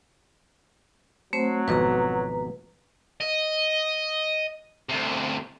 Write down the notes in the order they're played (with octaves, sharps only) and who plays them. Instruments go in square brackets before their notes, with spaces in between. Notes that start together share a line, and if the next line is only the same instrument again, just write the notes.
[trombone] F#3 [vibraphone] A3 C4 C5
[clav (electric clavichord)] G#1 F2 B2 [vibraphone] B4 A#5
[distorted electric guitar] D#5
D2 C3